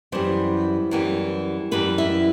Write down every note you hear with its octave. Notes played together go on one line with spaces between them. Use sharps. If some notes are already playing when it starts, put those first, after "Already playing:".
F#2 E3 G3 B3 C5
F#2 E3 G3 B3
F#2 E3 G3 B3 B4
E4